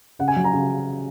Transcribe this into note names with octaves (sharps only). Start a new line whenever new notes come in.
C#3 F#5
G#5
F#3
A#5
C#3